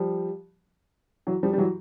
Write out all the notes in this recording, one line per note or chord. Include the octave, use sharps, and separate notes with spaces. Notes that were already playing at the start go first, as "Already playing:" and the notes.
Already playing: F3 G3
E3 F#3
F3 G3
G3
E3 F#3